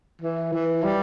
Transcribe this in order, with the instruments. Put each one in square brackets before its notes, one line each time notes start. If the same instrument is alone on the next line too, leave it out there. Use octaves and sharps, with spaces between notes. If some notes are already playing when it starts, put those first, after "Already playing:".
[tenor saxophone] E3
E3
G3